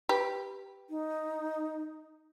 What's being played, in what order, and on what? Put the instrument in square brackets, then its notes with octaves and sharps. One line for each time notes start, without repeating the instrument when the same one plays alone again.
[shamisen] G4 B4
[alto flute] D#4